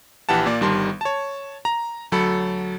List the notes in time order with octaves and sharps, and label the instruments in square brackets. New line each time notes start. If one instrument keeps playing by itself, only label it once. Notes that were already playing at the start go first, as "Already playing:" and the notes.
[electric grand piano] A#1 E3 G4 F#5 A5
A#2 A#3 D5
G1 D#3 G3 A5 C6
C#5 A5
A#5
D2 F#3 A4 B5 C#7